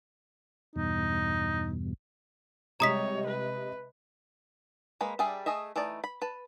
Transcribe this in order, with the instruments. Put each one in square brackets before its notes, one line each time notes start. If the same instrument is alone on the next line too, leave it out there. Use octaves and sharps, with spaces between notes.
[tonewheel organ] E2 G2 B2 [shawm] D#4
[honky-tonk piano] C3 G#3 D#5 [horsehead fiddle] G3 C#5 [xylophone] A#5 D#6 B6
[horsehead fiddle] B4
[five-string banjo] G#3 A#3 B4 B5
G3 D4 G#4 E5
A3 G#4 D#5 E5
E3 A3 D#4 D5
B5
B4 A5